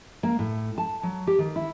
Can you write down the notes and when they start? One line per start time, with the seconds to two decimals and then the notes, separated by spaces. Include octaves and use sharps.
0.23 A#3
0.39 A2
0.78 A5
1.03 F#3
1.27 G4
1.38 D#3
1.56 E4